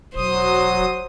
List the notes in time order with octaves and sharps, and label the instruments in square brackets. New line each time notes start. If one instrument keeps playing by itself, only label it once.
[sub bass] E1 [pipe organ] F#3 D#6 [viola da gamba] C5